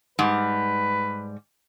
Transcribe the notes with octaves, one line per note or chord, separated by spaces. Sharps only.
G#2 G3 B4